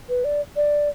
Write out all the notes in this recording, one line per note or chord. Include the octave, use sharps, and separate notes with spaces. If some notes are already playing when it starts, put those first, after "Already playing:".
B4
D5
D5